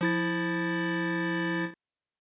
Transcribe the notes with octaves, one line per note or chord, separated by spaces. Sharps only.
F3 E4 A6